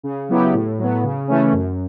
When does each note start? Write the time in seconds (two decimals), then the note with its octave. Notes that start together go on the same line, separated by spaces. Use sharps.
0.03 C#3
0.29 F#3 B3 E4 G4
0.53 A2
0.78 F#3 B3
1.03 C#3
1.28 E3 A3 C#4
1.53 F#2